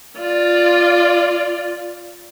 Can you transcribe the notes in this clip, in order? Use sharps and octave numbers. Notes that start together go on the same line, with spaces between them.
F4 D5